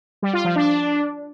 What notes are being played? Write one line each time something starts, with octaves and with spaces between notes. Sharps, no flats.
G3
F4
F3
D4